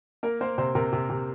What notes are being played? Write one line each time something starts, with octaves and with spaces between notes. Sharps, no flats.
A#3 A#4
A#3 C5
C3 C5
C3 A#4
C3
C3